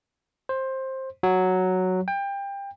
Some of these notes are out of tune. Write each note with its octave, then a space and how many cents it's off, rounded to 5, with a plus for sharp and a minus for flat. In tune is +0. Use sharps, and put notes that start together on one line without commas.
C5 +15
F#3 +0
G5 +25